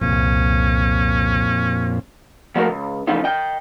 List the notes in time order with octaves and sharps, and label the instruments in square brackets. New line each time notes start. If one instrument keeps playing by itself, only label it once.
[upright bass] C2 [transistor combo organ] F2 A#2 [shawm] C#4
[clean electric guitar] F3 A3 A#3 F#4 A#4
C#2
C#3 E3 F3 A3 D#4 F4
D#5 G5